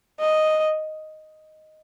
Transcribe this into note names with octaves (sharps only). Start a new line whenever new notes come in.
D#5